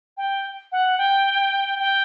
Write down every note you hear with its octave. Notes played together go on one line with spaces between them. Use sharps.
G5
F#5
G5
G5